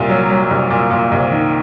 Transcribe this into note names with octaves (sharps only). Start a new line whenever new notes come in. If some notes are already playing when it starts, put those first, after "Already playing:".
Already playing: C2 A#2
F#3
F#3
C2
A#2
A#2
C2
D#3